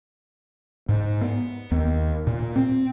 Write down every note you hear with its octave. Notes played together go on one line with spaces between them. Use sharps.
G#2
B3
D#2
A#2
C4